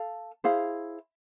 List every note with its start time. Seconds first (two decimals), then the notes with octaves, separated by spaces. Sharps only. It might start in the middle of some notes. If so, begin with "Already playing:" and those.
Already playing: A4 F5
0.44 E4 G#4 C5 F5